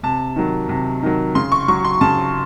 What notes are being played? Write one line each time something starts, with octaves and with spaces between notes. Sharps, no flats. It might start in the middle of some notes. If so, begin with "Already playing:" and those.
C3 A5
D#3 F#3
C3
D#3 F#3
C#3 C6
C#6
F#3 C#6
C6
C#3 A5